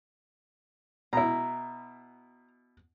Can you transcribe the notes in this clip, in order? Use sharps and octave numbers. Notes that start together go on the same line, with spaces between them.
B2 E4 A#5